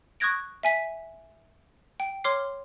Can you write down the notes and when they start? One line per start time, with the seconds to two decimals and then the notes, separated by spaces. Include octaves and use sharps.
0.20 C#6 D#6 F#6 G#6 A#6 D7
0.63 E5 G#5 B6
2.00 G5
2.24 C#5 C6 D6 F6 C7